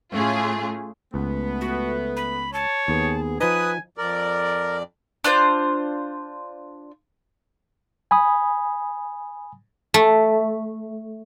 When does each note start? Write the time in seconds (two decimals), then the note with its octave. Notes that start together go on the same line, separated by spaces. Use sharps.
0.13 A2 A3 C#4 F4 G#4
1.14 C#2 A3 B3
1.61 F#4
2.17 B5
2.54 C#5 A5
2.88 D#2 B3 G#4
3.40 F3 D#4 B4 G#5 D#6
3.98 F2 A#4 D5
5.24 D4 F4 C5 G6
8.11 G#5 B5 D#6
9.94 A3